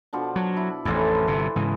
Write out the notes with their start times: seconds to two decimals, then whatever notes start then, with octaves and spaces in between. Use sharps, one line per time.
0.13 B2 F3 D4
0.36 F#3
0.56 E4
0.85 A1 F2 E3 A4 C5
1.27 G1 C3
1.56 G#2 C#3 E3